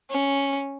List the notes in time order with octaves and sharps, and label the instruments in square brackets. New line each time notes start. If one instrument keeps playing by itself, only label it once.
[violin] C#4